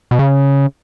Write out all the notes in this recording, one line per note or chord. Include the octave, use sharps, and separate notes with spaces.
B2
C#3